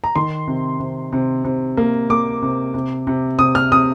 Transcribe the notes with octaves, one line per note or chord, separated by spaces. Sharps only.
A#5
D#3 C6
C3
C3
C3
C3
A#3
A#3 D6
C3
C3
C3
C3 D#6
F6
C3 D#6